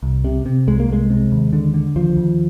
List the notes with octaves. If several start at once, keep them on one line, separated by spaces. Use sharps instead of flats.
C2
C3
C3
C2 G#3
A#3
C2 G#3
C3
D#2
D3
D3
D#2 F3
D#2